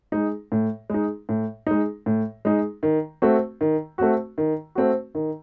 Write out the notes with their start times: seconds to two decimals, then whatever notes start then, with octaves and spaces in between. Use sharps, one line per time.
0.12 G#3 D#4
0.52 A2
0.90 G#3 D#4
1.29 A2
1.67 G#3 D#4
2.06 A2
2.45 G#3 D#4
2.83 D#3
3.22 A3 C4 F#4
3.61 D#3
3.98 A3 C4 F#4
4.38 D#3
4.75 A3 C4 F#4
5.15 D#3